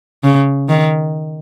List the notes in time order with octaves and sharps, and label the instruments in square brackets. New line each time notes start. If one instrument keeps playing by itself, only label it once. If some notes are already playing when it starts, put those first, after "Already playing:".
[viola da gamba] C#3
D#3